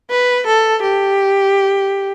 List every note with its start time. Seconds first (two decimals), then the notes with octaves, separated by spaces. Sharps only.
0.10 B4
0.47 A4
0.83 G4